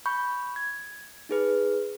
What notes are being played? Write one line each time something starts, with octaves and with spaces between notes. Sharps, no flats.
B5 C#6 G6
G#6
D#4 G#4 B4